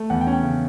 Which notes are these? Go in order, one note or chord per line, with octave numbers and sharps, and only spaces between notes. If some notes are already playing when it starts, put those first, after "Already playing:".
Already playing: A3
E2 F#5
G5
C#4
G5
C#3